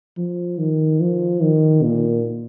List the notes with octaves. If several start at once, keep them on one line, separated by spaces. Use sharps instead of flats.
F3
D#3
F3
D#3
A#2